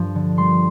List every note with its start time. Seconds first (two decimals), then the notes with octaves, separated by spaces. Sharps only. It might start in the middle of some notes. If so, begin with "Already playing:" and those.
Already playing: G2 F3
0.15 D3
0.38 G3 C6